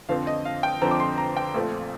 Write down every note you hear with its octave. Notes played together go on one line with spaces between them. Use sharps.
F2 D3 F3 C4 F5
D#5
F5
G5
F2 D3 F3 C4 A#5
D6
C6
A#5
G5
A#1 A#2 A3 C4 F4